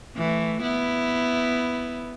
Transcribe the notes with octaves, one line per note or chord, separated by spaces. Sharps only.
E3 A3
B3 E4